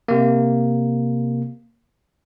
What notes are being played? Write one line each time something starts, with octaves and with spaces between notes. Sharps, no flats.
C3 A#3